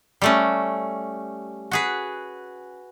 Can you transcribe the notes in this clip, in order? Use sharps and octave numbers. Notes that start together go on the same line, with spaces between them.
G3 A3 C#4
F#4 G#4 B4